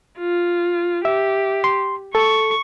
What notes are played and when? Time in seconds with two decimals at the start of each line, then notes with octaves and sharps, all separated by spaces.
0.19 F4
1.05 G4 E5
1.64 C6
2.15 A4 C#6